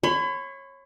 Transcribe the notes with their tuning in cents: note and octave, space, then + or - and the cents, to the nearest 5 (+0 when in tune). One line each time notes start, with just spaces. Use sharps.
C#5 -20 B5 +35